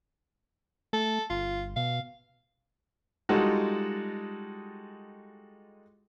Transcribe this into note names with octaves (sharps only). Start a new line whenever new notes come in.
A3 A4
G1 F4
B2 F5
G3 G#3 D#4 F4 F#4 A4